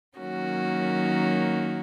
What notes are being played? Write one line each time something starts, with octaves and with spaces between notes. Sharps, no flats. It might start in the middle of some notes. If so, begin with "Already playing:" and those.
D#3 F#3 A#3 C#4 F#4